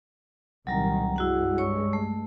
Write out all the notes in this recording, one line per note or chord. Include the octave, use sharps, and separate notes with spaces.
C2 A#2 D#3 F#3 G3 A#5
G2 G#3 E4 F#4 F#5
C#5 C#6 E6
A3